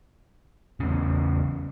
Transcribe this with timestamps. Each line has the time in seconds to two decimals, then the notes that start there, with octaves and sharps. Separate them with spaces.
0.80 E2 C#3